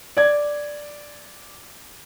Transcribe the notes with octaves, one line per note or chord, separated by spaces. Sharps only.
D5 G#6